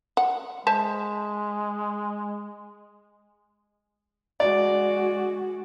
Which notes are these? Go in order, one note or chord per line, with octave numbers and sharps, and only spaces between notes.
F#5
G#3 C5 E5 A5
G#3 F#4 D5